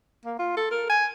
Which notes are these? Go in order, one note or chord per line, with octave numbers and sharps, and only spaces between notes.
A#3
F4
A4
A#4
G#5